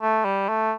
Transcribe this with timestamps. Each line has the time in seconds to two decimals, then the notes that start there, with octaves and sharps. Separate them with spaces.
0.02 A3
0.25 G3
0.49 A3